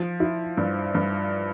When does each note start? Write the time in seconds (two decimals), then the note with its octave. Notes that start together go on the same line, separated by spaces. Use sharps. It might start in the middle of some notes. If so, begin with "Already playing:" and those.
Already playing: F3
0.20 E4
0.57 G2
0.95 G2